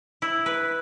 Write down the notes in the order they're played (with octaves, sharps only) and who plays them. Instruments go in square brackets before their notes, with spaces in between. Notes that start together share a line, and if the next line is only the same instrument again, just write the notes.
[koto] E4
B4